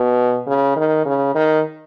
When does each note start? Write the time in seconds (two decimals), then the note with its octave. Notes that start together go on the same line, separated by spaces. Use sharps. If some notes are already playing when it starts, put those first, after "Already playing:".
Already playing: B2
0.47 C#3
0.76 D#3
1.06 C#3
1.35 D#3